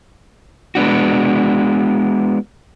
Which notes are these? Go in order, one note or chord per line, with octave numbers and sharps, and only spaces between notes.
G#3 B3 D4 F#4